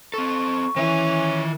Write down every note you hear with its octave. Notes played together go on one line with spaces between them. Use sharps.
C4 A4 C#6
D#3 E3 C#4 E5